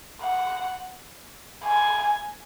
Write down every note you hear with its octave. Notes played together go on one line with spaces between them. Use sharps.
F#5
G#5